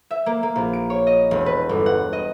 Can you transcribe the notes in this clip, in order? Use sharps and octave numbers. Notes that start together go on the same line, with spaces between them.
E5
A#3
A#3
A#1
D7
C#5
D#5
E1
B4
G1
F#5
D#5